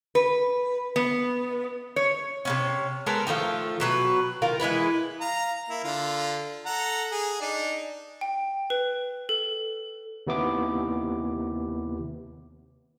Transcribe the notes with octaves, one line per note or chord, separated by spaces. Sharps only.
B4
B3
C#5
C3 B3 C#4
G#3 B3 A4 A#4
D#3 F3 A3 F4
B2 F#3 B4
D#3 F4 A#4
E3 G#3 E4 B4
F5 A#5
A#3 E4
D3 F4
A4 F#5 A#5
G#4
D4 D#4
G5
B4
A4
D#2 C3 B3 E4 D6